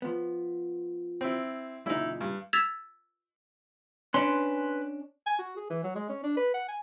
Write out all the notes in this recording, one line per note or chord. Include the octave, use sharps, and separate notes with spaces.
F3 B3
C4 E4
F#2 A#2 C#3 D#4 E4
G2
E6 G#6 A6 B6 E7 F7
C#4 D4 B4 G#5 C6
G#5
F#4
G#4
E3
F#3
G#3
C#4
D4
B4
F#5
G#5